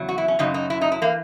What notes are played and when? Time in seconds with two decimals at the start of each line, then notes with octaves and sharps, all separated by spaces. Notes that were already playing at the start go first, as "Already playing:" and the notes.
Already playing: E2 C#3 F#3
0.09 F#4
0.18 E4
0.28 C#4
0.39 F#2 C#3 F#3 D#4
0.54 D#4
0.70 E4
0.81 D#4
0.92 E4
1.02 E3 A#3